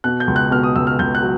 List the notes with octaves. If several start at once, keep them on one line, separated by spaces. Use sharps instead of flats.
B2 F#6
G6
C#2
F#6
B2 F6
D#6
C#2 E6
F6
C#2 G6
F#6
F#3